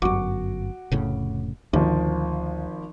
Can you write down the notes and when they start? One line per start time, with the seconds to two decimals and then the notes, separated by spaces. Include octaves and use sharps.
0.02 G1 F#2 F#4 C#6 D6
0.92 F1 A2 C#3
1.73 G#1 D2 F3